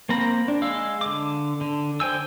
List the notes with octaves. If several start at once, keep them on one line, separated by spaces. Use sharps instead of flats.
A#3 C4 A#5 B5
D4
G#3 F5 E6
D3 D6
D3
D3 C5 G5 G#5 E6